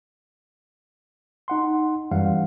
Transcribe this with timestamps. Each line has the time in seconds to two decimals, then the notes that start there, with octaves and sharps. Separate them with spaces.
1.48 D#4 F#5 C6
2.11 F#2 E3 G3 F5 F#5